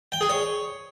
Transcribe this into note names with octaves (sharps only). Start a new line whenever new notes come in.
G5
G#4
C#5